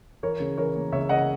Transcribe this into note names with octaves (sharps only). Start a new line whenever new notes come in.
E3 A#4 C#5
C#3
E3 A#4 C#5
A#3
C#2 C#5 E5
C#3 D#5 F#5